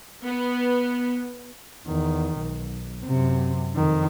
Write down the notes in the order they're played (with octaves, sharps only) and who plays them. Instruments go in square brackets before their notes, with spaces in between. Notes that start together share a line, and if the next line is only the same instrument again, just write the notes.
[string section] B3
[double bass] E2 D#3
B1
F#2 C3
F2 D#3